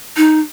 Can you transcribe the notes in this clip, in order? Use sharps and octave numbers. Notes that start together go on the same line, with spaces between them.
D#4